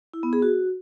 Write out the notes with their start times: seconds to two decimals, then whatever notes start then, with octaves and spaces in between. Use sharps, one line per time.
0.14 E4
0.23 B3
0.33 G#4
0.42 F#4